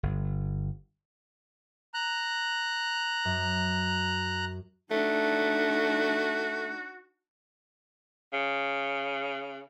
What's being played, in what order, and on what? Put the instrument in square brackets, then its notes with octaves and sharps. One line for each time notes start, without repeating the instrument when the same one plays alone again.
[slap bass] G1
[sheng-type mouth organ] A#5 F#6
[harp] F#2
[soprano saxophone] A3 [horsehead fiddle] D4 D#4 [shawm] F#4
[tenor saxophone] C#3